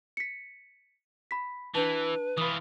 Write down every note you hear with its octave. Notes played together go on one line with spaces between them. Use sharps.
B6 C#7
B5 B6
E3 D4 B4 A5
E3 F4 B5 D#6